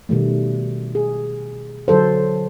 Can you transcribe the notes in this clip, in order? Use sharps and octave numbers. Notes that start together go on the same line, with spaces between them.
B2 D#3 G3 A3
G#4
D3 F#3 A4 C5